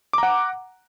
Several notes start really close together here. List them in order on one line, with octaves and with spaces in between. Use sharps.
D6 A#5 F#5